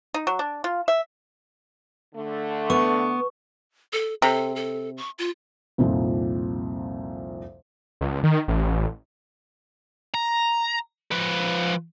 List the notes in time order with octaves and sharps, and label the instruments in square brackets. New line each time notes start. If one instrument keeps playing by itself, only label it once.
[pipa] D#4
F#3
D4
F4
E5
[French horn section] D3 A3
[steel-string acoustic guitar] B3 [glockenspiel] C#6
[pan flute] A4
[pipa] C3 [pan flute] A4
[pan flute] A4
C#6
F4
[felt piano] C2 F2 A#2 D#3 F3
[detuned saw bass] C#2
D#3
A1
[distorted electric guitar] A#5
F3 B4